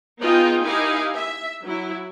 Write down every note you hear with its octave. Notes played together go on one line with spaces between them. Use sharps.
B3 D#4 F4 G#4 D#5 G5
D#4 E4 G4 A#4 F5 G#5
E5
F#3 E4